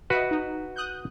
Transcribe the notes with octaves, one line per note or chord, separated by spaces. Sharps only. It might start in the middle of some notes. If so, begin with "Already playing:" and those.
F#4 B4 D#5 E5 B5
D#4
D#6 F#6 G6